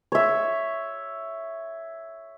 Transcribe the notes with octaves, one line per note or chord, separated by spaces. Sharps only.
C#5 E5